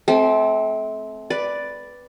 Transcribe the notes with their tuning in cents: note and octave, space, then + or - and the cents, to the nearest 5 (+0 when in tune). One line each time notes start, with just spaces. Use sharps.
A3 -35 C4 +0
B4 +0 D5 +0